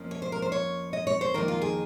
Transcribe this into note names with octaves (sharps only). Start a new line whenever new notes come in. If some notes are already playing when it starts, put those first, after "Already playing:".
Already playing: F2 F3 A#3 C#4
C#5
C5
A#4
C5
C#5
D#5
C#5
C5
F2 D#3 A#3 D#4 A#4
F4
G#4